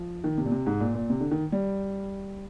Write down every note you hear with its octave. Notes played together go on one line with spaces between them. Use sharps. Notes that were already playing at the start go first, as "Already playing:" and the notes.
Already playing: F3
D#3
C3
A#2
C3
G#2
A#2
A#2
C3
D3
D#3
G3